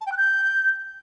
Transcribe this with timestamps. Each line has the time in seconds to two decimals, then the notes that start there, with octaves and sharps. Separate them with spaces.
0.01 A5
0.06 G5
0.12 F#6
0.17 G6